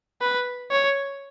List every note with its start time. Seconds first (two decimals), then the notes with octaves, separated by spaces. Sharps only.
0.21 B4
0.71 C#5